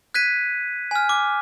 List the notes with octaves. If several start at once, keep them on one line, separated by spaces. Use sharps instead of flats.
F#6 G#6 B6 D#7
G#5 F6
D6